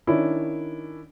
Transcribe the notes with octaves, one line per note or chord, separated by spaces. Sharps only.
D#3 C#4 D4 E4